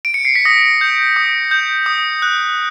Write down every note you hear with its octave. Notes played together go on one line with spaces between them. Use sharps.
D7
C#7
C7
B6
D#6 A#6
G6
D#6
G6
D#6
F#6